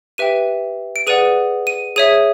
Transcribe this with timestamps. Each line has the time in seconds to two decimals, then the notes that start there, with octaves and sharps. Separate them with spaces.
0.18 G4 B4 E5 G5 D#7
0.96 D7
1.07 G#4 B4 D5 F#5 D#7
1.67 D#7
1.96 G#4 C#5 E5 D#7